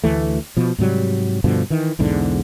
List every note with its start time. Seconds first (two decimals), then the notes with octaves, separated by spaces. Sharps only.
0.04 D2 E3 A3
0.57 B2 F3
0.78 G#2 C3 F#3 G3
1.44 G2 B2 D3 F3
1.70 D#3 E3
1.99 B1 E2 G#2 D3